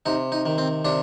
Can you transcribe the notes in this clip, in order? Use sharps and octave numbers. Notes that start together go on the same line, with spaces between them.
C3 D#4
D#4
D#3
C4
C3 D4